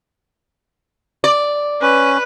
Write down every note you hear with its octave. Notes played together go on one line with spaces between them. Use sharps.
D5
C#4 B4